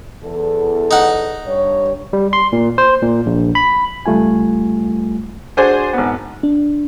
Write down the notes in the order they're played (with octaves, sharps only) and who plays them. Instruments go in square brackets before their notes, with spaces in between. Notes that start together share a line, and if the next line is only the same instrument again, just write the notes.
[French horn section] E2 A4
[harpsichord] D#4 F#5
[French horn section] G2 C#5
[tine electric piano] G3
C6
A#2
C5
A#2
A#1
B5
[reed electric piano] C#2 G3 A3 F4 G#5
[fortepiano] D4 F#4 G#4 C5 G#5
G#1 B3
[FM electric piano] D4